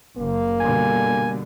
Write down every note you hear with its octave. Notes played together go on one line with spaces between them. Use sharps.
F#1 A#3
B2 D3 G3 G#5